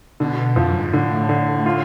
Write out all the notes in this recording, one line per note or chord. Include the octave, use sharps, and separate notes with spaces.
B2 D3
F2 F3
F#2
G#2
A2 D3
D3
F4